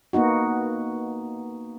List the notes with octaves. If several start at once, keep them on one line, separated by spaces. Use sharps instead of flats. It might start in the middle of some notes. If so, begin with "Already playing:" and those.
A#3 B3 D#4 F#4